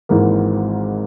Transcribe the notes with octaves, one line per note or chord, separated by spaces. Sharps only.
G#1 G#2 E3 A#3